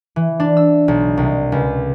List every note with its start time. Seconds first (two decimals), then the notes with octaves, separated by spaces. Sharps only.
0.16 E3
0.40 D4
0.57 E6
0.88 B1
1.17 C2
1.52 C#2